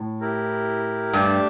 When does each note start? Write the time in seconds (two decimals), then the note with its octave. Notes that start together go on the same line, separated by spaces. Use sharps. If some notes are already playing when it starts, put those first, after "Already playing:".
Already playing: A2
0.21 E4 G4 A#4
1.13 G2 A3 D4 G4 D5 A5